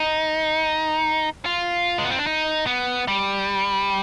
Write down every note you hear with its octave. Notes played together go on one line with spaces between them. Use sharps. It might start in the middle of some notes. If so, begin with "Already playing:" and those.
Already playing: D#4
F4
G#3
B3
C4
D4
D#4
B3
G3